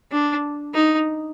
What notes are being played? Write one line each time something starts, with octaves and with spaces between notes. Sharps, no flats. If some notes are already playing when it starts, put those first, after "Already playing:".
D4
D#4